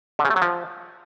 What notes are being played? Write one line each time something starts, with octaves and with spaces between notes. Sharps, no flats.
D3
C#3
A3
F#3
F3